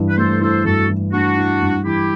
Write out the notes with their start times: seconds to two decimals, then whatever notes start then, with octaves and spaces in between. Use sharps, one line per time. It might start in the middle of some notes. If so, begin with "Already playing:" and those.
Already playing: G2 E3
0.09 B4
0.17 A3 A4 C5
0.41 E4 A4 C5
0.65 G2 F#4 A4
0.89 E3
1.13 A3 D4 F#4
1.37 E4
1.62 G2
1.85 E3 E4 G4